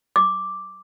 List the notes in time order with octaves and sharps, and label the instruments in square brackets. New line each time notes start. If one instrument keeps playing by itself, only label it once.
[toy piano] D6